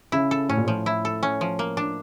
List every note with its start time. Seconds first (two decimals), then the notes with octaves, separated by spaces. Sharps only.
0.12 C#3 E4
0.31 A4
0.49 A2 C#4
0.57 A#2
0.65 A2 F3
0.86 E4
1.05 A4
1.23 C#4
1.41 F3
1.59 A#3
1.77 D4